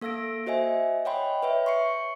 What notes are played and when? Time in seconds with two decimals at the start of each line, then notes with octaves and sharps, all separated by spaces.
0.01 A#3 A4 F5 E6 A#6 D7
0.46 F#4 C5 D#5 E5 G#5
1.05 C#5 D#5 F#5 G5 B5 C6
1.43 B4 C#5 E5
1.66 C6 C#6 C7 C#7